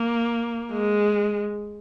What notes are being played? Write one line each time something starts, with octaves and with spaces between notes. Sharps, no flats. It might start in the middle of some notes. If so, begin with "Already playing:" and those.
Already playing: A#3
G#3